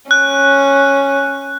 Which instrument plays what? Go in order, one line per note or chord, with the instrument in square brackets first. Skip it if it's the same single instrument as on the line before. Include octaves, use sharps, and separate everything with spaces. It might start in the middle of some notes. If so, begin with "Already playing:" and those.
[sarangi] C#4 [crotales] F#6